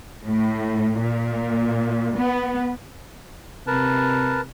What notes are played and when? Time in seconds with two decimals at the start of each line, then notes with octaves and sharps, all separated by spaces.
0.23 A2
1.02 A#2
2.15 B3
3.67 C3 A#4 B4 A5